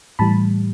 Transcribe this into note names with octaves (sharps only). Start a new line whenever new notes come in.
A2 E3 G3 A5 B5